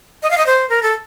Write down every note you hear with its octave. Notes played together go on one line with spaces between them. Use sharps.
D#5
F5
D#5
C5
A#4
A4